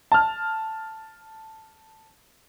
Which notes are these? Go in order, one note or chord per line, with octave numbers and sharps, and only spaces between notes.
A5 F6